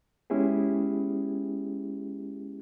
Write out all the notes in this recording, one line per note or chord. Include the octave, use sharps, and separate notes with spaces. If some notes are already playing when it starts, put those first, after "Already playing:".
G#3 B3 C#4 E4 G4 G#4